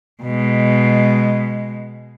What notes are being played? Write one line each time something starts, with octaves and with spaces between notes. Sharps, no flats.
B2 G#3